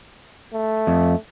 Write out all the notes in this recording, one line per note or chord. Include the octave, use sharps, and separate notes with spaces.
A3
F2